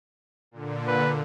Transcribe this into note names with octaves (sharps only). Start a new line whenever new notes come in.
A#2 D3
B4